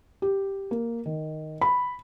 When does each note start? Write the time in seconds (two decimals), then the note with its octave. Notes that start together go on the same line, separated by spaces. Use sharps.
0.22 G4
0.71 A#3
1.06 D#3
1.61 B5